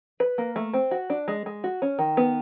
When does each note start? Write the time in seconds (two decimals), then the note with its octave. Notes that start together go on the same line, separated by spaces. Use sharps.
0.20 B4
0.38 A#3
0.56 A3
0.74 C4
0.91 F#4
1.10 D4
1.28 G#3
1.46 G#3
1.64 F#4
1.82 C#4
1.99 D#3
2.17 B3